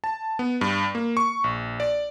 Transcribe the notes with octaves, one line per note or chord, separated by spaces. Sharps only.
A5
B3
G2
A#3
C#6
A#1
D5